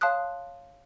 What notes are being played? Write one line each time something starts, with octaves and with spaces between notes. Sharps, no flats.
C#5 F5 A5 C6 D#6 F#6